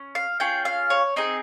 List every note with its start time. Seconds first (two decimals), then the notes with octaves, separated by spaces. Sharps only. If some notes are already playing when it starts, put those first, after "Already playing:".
Already playing: C#4
0.15 F5
0.40 C#4 F4 G#4 G5
0.65 F5
0.90 C#5
1.16 C4 D#4 G#4 D#5